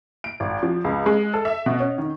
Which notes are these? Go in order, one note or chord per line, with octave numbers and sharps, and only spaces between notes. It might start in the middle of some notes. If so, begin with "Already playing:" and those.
D7
G#1
F3
C#2
G#3
A4
E5
B2
C#4
D#3